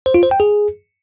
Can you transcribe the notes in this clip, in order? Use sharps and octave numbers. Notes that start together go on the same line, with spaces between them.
C5
F4
C5
G5
G#4